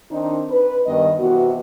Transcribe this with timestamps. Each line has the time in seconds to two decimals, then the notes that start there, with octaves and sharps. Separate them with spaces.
0.11 D#3 C4 D4 D#4
0.49 B4
0.87 G2 D#3 B3 D#5
1.19 C3 E3 B3 F#4